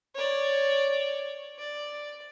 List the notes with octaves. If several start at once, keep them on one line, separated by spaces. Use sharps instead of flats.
C#5 D5
D5